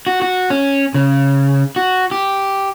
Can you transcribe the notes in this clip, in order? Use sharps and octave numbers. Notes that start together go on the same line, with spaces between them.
F#4
F#4
C#4
C#3
F#4
G4